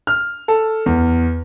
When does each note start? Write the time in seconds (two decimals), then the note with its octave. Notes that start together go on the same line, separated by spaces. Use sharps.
0.07 F6
0.48 A4
0.86 E2